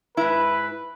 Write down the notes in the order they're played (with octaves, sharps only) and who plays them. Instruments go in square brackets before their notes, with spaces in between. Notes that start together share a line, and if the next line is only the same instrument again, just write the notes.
[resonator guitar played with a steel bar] G#2 E4 [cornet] B4